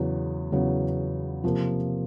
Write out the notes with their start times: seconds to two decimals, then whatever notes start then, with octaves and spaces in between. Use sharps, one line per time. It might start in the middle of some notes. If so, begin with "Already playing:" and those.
Already playing: E2 C#3 F#3 B3
0.52 E2 C#3 F#3 B3
1.44 C3 F3 A#3